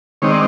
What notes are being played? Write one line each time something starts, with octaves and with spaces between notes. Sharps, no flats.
D#3 G#3 C4 D#4 C#5
D5